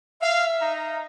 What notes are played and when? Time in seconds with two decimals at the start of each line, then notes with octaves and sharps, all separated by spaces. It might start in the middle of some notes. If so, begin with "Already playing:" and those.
0.21 E5 F5
0.60 D#4 A#5